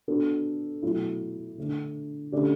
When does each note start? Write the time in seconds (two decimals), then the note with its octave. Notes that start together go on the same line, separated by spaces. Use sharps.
0.08 B3 D4 F#4 A4
0.83 B2 F#3 A3 E4
1.58 D3 A3 D4
2.32 D3 A3 C#4 G4 D5